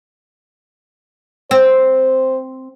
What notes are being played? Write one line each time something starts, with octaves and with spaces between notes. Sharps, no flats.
C4 C5